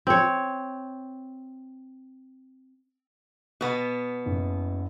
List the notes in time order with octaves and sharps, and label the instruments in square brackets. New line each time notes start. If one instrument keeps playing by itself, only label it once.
[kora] C4 C#5
[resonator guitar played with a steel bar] B2 B3
[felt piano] F#1